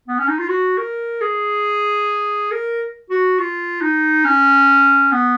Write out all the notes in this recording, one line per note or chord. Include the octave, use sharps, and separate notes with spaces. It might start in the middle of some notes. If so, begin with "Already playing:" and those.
B3
C#4
D#4
F4
F#4
A#4
G#4
A#4
F#4
F4
D#4
C#4
B3